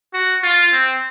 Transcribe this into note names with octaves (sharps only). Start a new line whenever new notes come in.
F#4
F4
C4